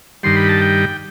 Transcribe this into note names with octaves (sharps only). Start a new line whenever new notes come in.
G2 D#3 G3 C6
B5
A5
G5